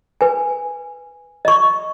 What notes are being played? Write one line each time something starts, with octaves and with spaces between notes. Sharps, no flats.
B4 G#5
D#5 C#6